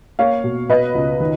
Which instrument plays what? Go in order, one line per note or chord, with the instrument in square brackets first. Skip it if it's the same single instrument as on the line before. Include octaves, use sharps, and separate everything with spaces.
[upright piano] A#3 C#5 F5
B2
B2 B4 D#5
C#2
D#3